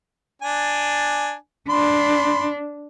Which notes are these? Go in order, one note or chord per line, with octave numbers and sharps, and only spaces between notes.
D4 G#5
D4 B5 C6